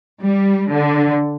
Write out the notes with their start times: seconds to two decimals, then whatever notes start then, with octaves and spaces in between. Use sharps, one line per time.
0.23 G3
0.71 D3